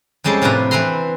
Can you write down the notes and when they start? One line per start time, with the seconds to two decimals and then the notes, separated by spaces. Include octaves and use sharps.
0.24 F2 G3 G#3 C#4 A4 C5
0.42 A2 C3 D4 F4 B4 A#5
0.71 E3 C4 B4 A#5 C6